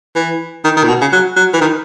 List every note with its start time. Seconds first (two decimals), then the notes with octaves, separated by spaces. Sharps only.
0.15 E3
0.64 D#3
0.77 D#3
0.84 A#2
0.88 B2
1.01 C#3
1.12 F#3
1.36 F#3
1.53 E3
1.61 D#3